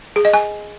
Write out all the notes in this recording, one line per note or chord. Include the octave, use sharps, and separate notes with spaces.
G#4
D#5
G#5